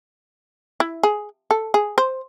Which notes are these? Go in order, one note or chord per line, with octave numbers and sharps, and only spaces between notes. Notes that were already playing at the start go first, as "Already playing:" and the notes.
E4
G#4
A4
G#4
C5